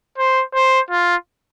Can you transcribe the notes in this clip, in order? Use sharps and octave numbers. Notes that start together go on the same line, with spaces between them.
C5
C5
F4